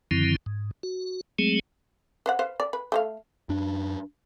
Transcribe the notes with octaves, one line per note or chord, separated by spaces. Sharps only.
F#2 D3 D#3 F3 C4 E4
G#2
F#4
F#3 G#3 A3 C4 G#4
B4 C5 F#5
B4 C5 F5
D5
B4
A3 C5 F5
F#2 D4